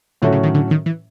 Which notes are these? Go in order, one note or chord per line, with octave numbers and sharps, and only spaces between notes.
A2 D3 F#3 A3 C#4 F#4
C#3
D#3
D3
D#3
E3